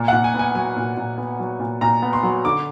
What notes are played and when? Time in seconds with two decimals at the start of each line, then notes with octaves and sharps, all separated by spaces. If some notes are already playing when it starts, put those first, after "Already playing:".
Already playing: A#2
0.08 F#5
0.13 A#2
0.24 G#5
0.34 B3
0.39 G#5
0.55 F#3 G#5
0.77 A#2
0.97 A#2
1.18 B3
1.40 F#3
1.60 A#2
1.81 A#2 A#5
2.02 B3
2.13 C6
2.23 F#3
2.45 D3 D6